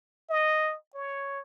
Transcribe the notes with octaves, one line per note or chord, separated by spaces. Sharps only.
D#5
C#5